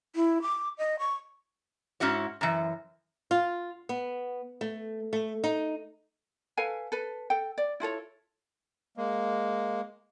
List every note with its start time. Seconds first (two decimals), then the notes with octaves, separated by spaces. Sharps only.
0.15 E4
0.42 D6
0.78 D#5
0.99 C#6
2.00 G#2 C#4 E4 F#4 C#5
2.41 F#2 E3
3.31 F4
3.89 B3
4.61 A3
5.13 A3
5.44 D#4
6.57 A4 B4 F5 G#5
6.92 A4 B4
7.30 A4 G5
7.58 D5
7.80 E4 F4 A4 C#5
8.97 G#3 A#3